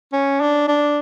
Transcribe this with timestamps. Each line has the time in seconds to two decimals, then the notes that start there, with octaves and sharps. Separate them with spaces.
0.13 C#4
0.41 D4
0.68 D4